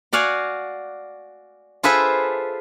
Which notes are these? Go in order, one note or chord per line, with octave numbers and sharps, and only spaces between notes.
F#4 D5 F5 F#5 G#5
F4 G#4 A4 B4 C5 E5